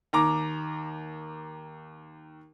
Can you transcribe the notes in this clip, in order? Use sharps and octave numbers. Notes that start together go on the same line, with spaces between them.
D#2 A#5 D6